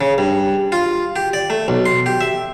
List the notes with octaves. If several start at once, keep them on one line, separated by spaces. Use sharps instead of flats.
C#3
G2
F4
G4
D5
A3
B1
C6
G4
E5